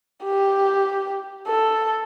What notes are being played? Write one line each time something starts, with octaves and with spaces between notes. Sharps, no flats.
G4
A4